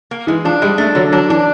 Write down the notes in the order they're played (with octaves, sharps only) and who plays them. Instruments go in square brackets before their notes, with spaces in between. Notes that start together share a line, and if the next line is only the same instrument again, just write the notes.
[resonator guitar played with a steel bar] A#3
[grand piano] E3 [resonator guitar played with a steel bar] G#3
[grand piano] F3 [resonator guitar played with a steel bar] D4
[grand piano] G3 [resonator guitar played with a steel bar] G#3
[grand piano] A3 [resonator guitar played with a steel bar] D4
[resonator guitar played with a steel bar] D3 [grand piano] F#3
[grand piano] F#3 [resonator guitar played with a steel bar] D4
[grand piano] E3 [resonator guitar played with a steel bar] D4